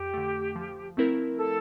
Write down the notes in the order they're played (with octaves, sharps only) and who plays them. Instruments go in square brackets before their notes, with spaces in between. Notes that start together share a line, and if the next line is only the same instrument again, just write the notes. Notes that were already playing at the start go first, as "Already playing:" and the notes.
Already playing: [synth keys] F2 [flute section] G4
[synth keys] D3 A3
F3
A3 C4 E4 A#4
[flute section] A4